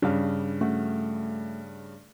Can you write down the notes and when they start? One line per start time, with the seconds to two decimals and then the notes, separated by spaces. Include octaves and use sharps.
0.02 G2 C#3 D4 F5
0.61 A3 C#4 F#4